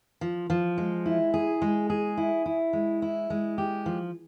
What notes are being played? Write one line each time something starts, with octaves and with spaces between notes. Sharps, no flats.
F3
F3
G#3
E4
G#4
G#3
G#4
E4
E4
G#3
E4
G#3
G4
F3